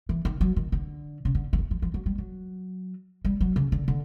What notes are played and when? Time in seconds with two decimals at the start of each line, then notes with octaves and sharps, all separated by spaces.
0.09 E3
0.25 D#3
0.41 F#3
0.56 D#3
0.72 D3
1.25 C#3
1.35 D3
1.53 E3
1.59 D#3
1.71 F3
1.82 F3
1.94 F#3
2.06 G3
2.18 F#3
3.25 G3
3.41 F#3
3.56 C#3
3.72 D3
3.88 D3